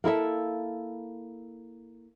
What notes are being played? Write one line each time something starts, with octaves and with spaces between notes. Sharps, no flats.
A#3 E4 A4 E5